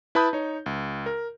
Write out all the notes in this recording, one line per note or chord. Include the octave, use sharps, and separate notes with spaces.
E4 B4 A5 B5 D#6 G6
D#4 C#5
C#2
A#4